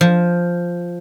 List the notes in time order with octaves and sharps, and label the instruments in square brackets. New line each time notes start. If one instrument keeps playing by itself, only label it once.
[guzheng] F3